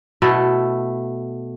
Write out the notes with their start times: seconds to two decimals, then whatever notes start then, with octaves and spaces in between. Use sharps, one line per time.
0.22 B2 A3 E4